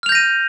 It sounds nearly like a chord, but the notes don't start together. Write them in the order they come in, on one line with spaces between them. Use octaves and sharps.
F6 F7 G6 A#6 D#7